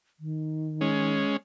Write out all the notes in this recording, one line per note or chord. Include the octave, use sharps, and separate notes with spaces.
D#3
G#3 C#4